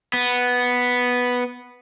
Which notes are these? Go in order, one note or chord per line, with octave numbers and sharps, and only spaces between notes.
B3